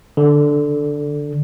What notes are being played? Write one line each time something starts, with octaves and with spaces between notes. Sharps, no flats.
D3